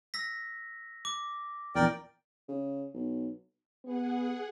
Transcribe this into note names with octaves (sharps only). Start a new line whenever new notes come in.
E6 A#6 B6
D6
A#1 E2 A#4 D5 G5
C#3
B1
B3 G#4 F#5